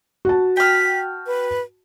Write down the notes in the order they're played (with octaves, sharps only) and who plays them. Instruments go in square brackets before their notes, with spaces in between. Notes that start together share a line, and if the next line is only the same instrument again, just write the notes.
[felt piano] F#4 A5
[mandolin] G5 F6 [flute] B6
[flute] B4